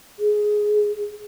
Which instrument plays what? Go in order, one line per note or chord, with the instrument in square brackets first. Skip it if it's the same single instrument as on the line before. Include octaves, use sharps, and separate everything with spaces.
[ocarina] G#4